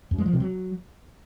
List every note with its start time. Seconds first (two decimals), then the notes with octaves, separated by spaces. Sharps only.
0.11 F#2
0.18 G#3
0.26 F3
0.33 C3
0.40 F#3